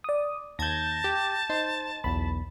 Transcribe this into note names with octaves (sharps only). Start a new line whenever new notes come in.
D5 D#6
D#2 A5 G6 G#6 A#6
G4
D#4 C5
B1 E2 B5